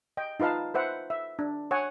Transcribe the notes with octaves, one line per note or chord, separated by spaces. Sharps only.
D#5 G5
D#4 F4 B4 F5 A5
B4 C5 E5 F#5
E5
D4
C#5 F#5 G#5